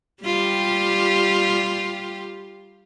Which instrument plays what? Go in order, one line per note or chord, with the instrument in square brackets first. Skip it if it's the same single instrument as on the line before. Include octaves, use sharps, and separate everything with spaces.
[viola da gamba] G3 F4 G4